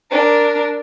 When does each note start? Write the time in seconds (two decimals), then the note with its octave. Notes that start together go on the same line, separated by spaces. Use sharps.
0.11 D4 A#4